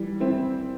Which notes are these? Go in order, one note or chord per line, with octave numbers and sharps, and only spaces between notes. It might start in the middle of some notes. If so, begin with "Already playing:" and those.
Already playing: E3 G3
C4 E4